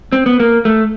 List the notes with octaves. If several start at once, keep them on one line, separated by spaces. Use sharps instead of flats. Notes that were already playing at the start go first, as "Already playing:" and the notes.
C4
B3
A#3
A3